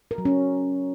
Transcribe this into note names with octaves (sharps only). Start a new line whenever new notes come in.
A#4
F#3
C#4